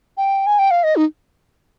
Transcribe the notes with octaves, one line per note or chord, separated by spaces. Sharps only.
G5
G#5
G5
F5
D#5
D#4